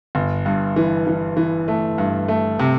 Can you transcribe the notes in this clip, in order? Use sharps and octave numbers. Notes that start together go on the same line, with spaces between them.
G1
G2
E3
E3
E3
A3
G2
A3
C3